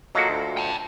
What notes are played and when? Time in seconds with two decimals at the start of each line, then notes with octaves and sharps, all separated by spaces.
0.15 F#3 A#3 F4 F#4 A4 D#5
0.30 D2
0.57 G5 A5